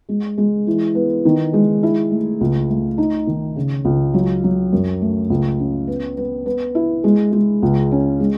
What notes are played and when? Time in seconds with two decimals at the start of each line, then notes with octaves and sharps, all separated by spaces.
0.09 G#3
0.38 G#3
0.67 E3
0.95 B3
1.25 D#3
1.53 G#3
1.83 E4
2.11 A3
2.41 C#2
2.69 A3
2.98 D#4
3.27 D#3
3.56 C#3
3.85 C#2
4.14 F#3
4.44 F#3
4.73 F#2
5.01 A3
5.30 C#2
5.59 C#4
5.87 B3
6.17 B3
6.46 B3
6.75 E4
7.04 G#3
7.32 G#3
7.62 C#2
7.91 C#4
8.20 G#3